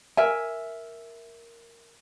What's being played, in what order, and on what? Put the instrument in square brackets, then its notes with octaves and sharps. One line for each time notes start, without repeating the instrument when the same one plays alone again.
[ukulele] A#4 E5 G#5